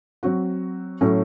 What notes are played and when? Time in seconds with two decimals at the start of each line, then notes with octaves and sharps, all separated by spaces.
0.23 F#3 C4 F#4
1.01 A2 F#3 A3 C#4